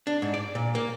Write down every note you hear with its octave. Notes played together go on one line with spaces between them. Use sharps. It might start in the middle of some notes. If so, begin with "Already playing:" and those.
D4
G#2
D5
A#2
A#3